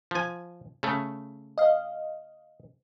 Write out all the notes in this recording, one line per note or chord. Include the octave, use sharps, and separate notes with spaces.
F3 G#5
C#3 A3
D#5 F5